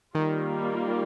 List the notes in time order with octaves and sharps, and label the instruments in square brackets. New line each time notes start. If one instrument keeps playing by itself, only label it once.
[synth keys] D#3 [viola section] G3 A#3 F4